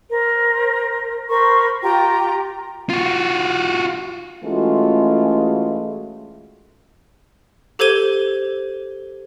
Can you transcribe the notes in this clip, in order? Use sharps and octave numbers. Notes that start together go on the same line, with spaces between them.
A#4 C5
A#4 C5 B5 C#6
F4 G4 G5 A#5
F4 F#4
E3 G#3 A3 C#4 F4 F#4
G4 A4 C5 G#6 D#7 G7